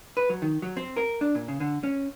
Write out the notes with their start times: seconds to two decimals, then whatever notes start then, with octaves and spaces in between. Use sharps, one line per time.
0.17 B4
0.30 F#3
0.42 D#3
0.62 F#3
0.77 C4
0.97 A#4
1.21 D4
1.35 A#2
1.48 C#3
1.60 D3
1.83 C#4